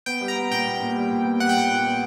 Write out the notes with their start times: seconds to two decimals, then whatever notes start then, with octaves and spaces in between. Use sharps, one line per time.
0.06 B3 G5
0.21 G3
0.28 A#5
0.36 B3
0.51 A#2 G5
0.66 A#2
0.81 A#2
0.96 G3
1.10 A#2
1.25 B3
1.40 G3 F#5
1.49 G5
1.56 A#2 F#5
1.71 A#2
1.86 B3